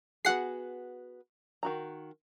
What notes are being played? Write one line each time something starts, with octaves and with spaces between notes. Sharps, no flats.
B3 F#4 G#4 F#5 C7
D#3 F#4 A#5